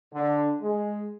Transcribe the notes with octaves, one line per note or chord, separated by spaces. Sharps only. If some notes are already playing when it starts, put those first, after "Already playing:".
D3
G#3